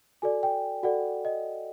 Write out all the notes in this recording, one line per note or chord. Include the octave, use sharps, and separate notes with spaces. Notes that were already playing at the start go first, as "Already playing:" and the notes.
F#4 A4 D5 G#5
G5
F#4 A4 D5 F#5
D#5